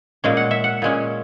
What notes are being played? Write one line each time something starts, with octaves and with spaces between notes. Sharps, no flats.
A#2 G#3 C#4
F#5
E5
F#5
A#2 G#3 C#4